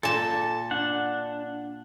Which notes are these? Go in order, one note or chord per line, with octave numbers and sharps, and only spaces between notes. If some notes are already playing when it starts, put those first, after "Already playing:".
A#2 A4 A5
D4 F#5